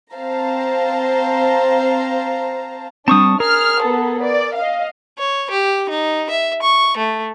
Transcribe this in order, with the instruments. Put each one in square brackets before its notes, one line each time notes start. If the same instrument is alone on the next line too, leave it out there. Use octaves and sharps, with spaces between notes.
[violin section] C4 C5 F5 A5 A#5
[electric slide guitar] G3 C4 [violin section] D4 [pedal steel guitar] A5 C#6 D#6
[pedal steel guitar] G#4 [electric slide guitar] A#4 [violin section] F6
[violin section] B3 A4
D5
D#5 F5
[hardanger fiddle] C#5
G4
D#4
E5
C#6
A3